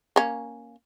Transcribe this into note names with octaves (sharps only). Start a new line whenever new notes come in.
A#3 C#4